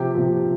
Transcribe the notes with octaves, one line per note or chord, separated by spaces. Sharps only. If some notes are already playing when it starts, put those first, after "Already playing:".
Already playing: C3 F3 G4 G5
C3 F3